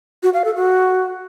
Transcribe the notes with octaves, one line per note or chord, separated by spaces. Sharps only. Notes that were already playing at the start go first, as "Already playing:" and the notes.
F#4
F5
A4
F#4